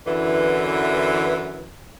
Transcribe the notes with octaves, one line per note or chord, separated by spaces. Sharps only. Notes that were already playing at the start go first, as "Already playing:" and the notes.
F#2 D3 E3